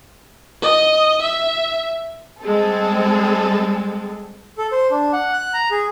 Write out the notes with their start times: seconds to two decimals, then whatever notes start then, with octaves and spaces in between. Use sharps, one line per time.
0.62 D#5
1.22 E5
2.42 G3 G#3 C4 G#4 A4
4.58 A4
4.72 C5
4.91 D4
5.13 F#5
5.33 F#6
5.54 A#5
5.71 G#4